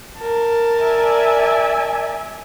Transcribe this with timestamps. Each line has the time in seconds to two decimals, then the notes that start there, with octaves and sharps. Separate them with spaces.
0.18 A#4 A5
0.81 D5 E5 G#5